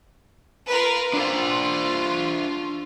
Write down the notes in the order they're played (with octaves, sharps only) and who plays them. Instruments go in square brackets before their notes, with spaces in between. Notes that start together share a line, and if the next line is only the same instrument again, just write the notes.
[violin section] F4 A#4 B4
[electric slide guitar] D4 C5 [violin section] F4